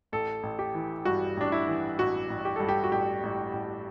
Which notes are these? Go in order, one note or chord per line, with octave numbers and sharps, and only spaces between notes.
A1 A4
A1
G4
E3
G2 F#4
A1 D4
E4
E3
A1 F#4
A1
G4
G2 A4
G4
F#4
A1 G4
A1
A1